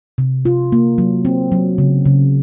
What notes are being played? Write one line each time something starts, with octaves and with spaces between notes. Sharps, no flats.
C3
F4
A#3
F#3
C4
F#3
C#3
C#3